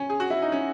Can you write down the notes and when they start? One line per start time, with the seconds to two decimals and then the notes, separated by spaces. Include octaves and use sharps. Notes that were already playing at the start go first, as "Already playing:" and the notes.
Already playing: C#4
0.10 G#4
0.20 F#4
0.30 E4
0.42 D#4
0.52 C#4